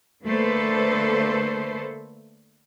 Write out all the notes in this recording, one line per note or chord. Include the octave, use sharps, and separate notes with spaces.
D3 A3 A#3 A4 B4 C5